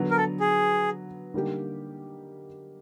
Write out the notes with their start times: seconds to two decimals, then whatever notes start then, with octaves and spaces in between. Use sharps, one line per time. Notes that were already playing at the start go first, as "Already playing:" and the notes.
Already playing: D3 F#3 B3
0.11 A#4
0.17 A4
0.40 G#4
1.34 D3 G3 A#3 D#4 G4